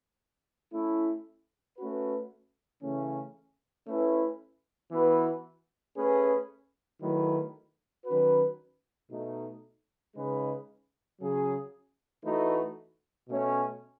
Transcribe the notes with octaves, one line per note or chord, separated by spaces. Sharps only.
A3 C#4 E4
A3 C#4 F#4 B4
C#3 E3 A3 C#4
A3 C#4 E4 B4
E3 B3 F#4 B4
A3 C#4 G#4 B4
D#3 F#3 A3 E4 B4
D#3 F#3 C#4 F#4 B4
B2 A3 D#4
C#3 G#3 D#4 G#4 B4
C#3 F#3 C#4 G#4
E3 A3 D#4 F#4 B4
B2 A3 C#4